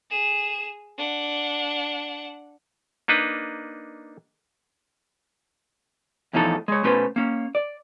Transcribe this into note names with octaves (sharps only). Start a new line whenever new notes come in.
G#4 E7
D4 F#5
A#3 D4 D#4 B4
E2 A2 F3 D#4 A4
G#3 C#5
B2 A3 C#4 B4 C5
A#3 C#4
D5